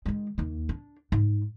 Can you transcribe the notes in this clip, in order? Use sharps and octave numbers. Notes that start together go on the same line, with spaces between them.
D#3 G#3
D#2 A#3
D4
G#2